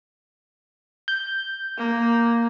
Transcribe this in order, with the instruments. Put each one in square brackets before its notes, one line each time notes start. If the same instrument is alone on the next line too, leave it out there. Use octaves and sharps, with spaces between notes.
[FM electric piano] G6
[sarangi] A#3